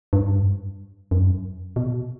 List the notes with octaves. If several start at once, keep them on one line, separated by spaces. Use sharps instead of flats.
G2
F#2
B2